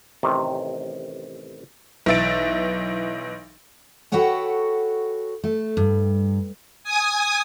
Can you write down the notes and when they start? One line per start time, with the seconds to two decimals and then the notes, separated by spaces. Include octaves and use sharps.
0.23 A1 C3 D#3
2.06 B1 E3 E5 A6 D7
4.12 F#4 A4 B4 C#5 F#5 G5
5.44 A3
5.77 G2
6.84 G#5 D#6